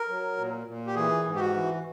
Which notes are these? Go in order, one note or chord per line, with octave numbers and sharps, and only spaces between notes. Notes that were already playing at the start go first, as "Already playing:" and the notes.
Already playing: A#4
F#3
A#2
A#2
G4
E3 G#4
G#2
G4
F#4
E3